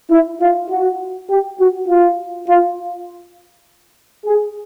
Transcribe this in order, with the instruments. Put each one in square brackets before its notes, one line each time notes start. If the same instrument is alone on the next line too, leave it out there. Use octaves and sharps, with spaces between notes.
[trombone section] E4
F4
F#4
G4
F#4
F4
F4
G#4